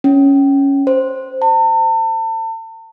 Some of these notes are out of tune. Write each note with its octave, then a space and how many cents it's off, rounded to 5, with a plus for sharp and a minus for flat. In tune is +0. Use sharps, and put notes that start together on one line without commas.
C#4 +0
C5 +0
A5 +40